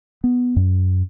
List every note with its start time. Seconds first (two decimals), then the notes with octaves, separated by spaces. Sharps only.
0.24 B3
0.56 F#2